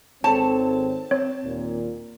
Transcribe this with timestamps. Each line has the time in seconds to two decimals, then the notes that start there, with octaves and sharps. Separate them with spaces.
0.24 G#1 C4 A4 C#5 A5
1.11 C4 C#5
1.44 D#2 A#2